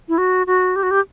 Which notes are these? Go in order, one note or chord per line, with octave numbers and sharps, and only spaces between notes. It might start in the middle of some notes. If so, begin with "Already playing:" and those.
E4
F#4
F#4
G4
F#4
G4